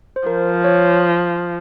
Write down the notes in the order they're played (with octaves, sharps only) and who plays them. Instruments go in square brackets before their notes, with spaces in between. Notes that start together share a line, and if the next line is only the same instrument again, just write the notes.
[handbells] C5
[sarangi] F3 [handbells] A#4
[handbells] C#5